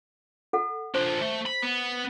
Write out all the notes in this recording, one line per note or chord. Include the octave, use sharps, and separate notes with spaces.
A4 F#5
D4 F4 C5
A3
B5
B3